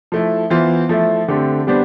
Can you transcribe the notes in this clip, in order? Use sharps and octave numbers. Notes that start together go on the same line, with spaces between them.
F3 A3 E4
E3 B3 F4 C5
F3 A3 E4
D3 A3 C4 G4
G3 B3 D4 G4 C5